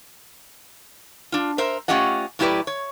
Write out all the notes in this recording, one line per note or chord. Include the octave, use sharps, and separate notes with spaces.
D4 F4
A#4 C5 E5
A3 C#4 F4 G4 D#5 F#5
A2 F#3 E4 G4 B4 D5
C#5